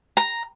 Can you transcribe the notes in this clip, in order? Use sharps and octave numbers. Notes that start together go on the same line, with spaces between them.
A#5